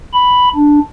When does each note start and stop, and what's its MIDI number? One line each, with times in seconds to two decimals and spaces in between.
0.13 0.49 83
0.55 0.79 62